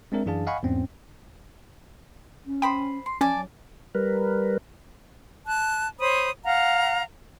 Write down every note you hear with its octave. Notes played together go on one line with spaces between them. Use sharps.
G#3 C4 D4 A#4 E5
F#2 E3 D4 G#4 F5 A5
D#5 F5 F#5 G#5 B5 C#6
E2 G#2 C4 C#4
C#4
C5 G5 B5 D#6
C6
F3 C#4 D5 G#5 A5
F#3
G3 A#4 B4
A5 F#6
C5 C#5 B5 D#6
F5 F#5 A#5